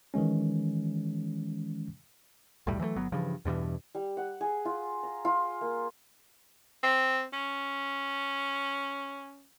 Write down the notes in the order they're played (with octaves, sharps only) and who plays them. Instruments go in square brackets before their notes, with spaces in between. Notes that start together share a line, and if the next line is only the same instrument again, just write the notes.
[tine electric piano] D#3 E3 G#3 C#4
[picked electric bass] B1 E2 A2 G3
E3 F#3 G3 A3
G1 F#3 B3
G2 C#3 E3 F3
E2 G2 B2 E3
[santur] G3
F#5
G#4
F4
A#5
F4
A#3
[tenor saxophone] C4
C#4